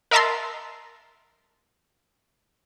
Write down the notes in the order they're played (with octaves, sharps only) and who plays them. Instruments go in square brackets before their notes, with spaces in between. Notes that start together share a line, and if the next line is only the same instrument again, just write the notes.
[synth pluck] A#4 D#5 E5 A5 A#5 C6